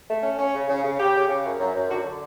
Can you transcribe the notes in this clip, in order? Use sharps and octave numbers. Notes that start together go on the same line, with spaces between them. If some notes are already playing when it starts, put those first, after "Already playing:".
A3
C#4
C#4
C#3
C#3
C#3
C#3 G4
C#3
C#3
F#2
F#2
F#2
D3 F#4
D3